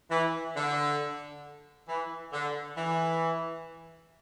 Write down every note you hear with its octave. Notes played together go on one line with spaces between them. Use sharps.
E3
D3
E3
D3
E3